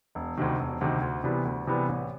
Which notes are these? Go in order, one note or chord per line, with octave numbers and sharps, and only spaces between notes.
E1
D2 C3 D#3
E1
D2 C3 D#3
D2
C3 E3 G3 B3
D2
C3 E3 G3 B3
A1